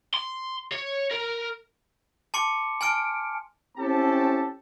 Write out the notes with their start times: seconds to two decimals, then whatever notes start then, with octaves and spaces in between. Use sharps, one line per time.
0.14 C6
0.72 C#5
1.11 A#4
2.34 A5 C6 D6 C#7
2.81 G#5 A5 F6 D7
3.77 C4 C#4 E4 G4 A4 A5